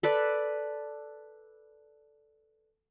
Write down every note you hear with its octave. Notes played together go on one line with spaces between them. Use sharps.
A4 B4 D5